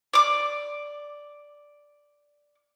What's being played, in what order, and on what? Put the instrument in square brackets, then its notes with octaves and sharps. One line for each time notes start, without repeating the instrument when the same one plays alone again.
[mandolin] D5 D6